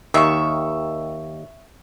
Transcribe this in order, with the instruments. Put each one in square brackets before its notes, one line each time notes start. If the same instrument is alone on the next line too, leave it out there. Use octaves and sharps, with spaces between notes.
[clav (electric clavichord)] D#2 D#3 [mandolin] E5 C#6